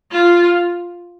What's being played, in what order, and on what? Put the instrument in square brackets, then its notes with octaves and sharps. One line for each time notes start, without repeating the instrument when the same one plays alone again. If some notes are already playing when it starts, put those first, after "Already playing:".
[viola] F4